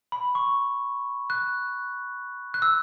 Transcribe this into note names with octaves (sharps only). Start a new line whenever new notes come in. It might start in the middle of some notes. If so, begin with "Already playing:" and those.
B5
C#6
F#6
F#6
E6